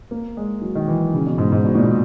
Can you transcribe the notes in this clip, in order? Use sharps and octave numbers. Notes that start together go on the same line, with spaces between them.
A#3
G#3
F#3
D#3
E3
C#3
B2
G#2
G#2
B2
A#2
B2